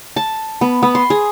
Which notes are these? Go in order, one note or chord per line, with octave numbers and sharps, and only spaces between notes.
A5
B3
B3
C6
G#4